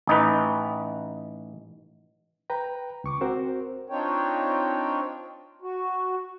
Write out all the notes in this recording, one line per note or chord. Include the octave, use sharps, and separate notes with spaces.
A1 D#4 B4
B4 G5 A#5
C#2 C#6 D6
C4 F#4 A#4 C5
C4 D4 D#4 F4 C#5 G5
F#4